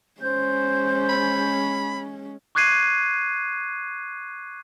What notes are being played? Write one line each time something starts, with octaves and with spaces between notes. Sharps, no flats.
G#3 C#4 C5 G6
B5
C#6 D6 F#6 G#6 C7 D#7